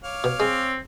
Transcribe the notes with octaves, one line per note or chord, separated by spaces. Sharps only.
C#5 F5 D6
B2
G#3 C4